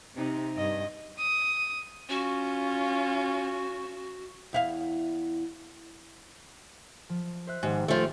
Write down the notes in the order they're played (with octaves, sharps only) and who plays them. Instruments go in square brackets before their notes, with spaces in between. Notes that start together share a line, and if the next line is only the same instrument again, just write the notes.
[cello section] C3 [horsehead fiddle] D#4
[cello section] G2 [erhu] D#5
[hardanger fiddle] D#6
[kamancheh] C#4 F4 [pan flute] F#4
[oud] E2 E4 F5
[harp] F3
C5 E5 F#6
[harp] G#1 G4 G#5 [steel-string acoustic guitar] G#2
[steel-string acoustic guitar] F3 A3